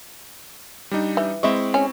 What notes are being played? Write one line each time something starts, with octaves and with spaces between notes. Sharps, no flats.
G3 D4 D#4
E3
G#3 C4 E4 E5 C#6
C#4